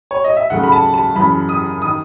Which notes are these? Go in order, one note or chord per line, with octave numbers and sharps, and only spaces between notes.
C#5
D#5
E5
D#2 C#3 F#3 A3 F#5
B5
A5
A5
F#2 C#3 E3 B5
D#6
D#3 D#6